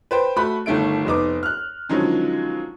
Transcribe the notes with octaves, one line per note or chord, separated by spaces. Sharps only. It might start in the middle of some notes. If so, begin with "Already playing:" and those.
B4 C5 G5
A3 F#4 B5 F#6
G1 D#3 A3 E4 D7
F1 B3 D#4 D6
F6 F#6
D3 D#3 F3 F#3 G#3 C#4